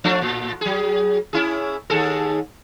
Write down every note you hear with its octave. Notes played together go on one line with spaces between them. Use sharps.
F3 A3 D4
A2
F#3 G#4
C#4 E4 G#4
D#2 G#4 A4